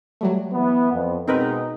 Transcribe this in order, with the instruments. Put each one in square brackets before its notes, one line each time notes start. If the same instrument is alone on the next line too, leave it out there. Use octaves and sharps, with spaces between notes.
[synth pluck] F#3 G3 A3
[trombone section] E3 B3
F2
[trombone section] B2 G#3 D#4 [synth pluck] C4 A#4 B4